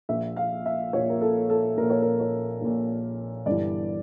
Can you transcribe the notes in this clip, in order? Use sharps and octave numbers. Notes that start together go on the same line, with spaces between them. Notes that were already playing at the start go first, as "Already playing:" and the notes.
A#1 A#2 E5
F5
E5
A#1 A#2 C#5
A#4
A4
A4
A#1 A#2 A#4
C#5
A#4
C#5
A#1 A#2
G1 G2 E3 D5